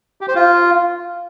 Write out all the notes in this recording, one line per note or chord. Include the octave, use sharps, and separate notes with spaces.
G4
C5
F4